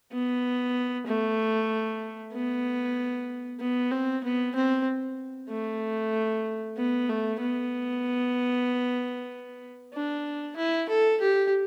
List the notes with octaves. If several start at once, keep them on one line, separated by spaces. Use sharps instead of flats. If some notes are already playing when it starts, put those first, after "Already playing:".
B3
A3
B3
B3
C4
B3
C4
A3
B3
A3
B3
D4
E4
A4
G4